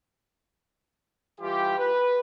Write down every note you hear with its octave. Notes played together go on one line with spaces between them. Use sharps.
E3 G3 F4 G4
B4